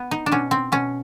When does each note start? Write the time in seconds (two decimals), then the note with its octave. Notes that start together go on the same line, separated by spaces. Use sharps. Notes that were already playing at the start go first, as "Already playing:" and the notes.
Already playing: B3
0.11 D#4
0.26 D4
0.32 B2 C#4
0.51 C4
0.72 B2 C#4